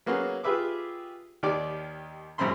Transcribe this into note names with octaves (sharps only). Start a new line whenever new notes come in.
F#3 A#3 B3 C#4 G#4
F4 G4 G#4 B4 E5 D6
D#2 D#3 G4 D5 D6
G#1 F#2 A#2 C5 B5 C6